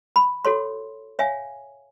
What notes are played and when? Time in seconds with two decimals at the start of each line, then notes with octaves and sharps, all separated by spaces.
0.16 B5
0.45 F#4 A4 C#5 C6
1.19 C#5 E5 F5 G#5